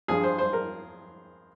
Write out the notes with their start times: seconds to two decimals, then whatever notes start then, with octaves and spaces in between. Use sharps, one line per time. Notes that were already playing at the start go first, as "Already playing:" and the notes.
0.08 G2 F3 G#4
0.23 C5
0.38 C5
0.53 A#4